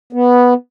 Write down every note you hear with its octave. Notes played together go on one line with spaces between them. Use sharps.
B3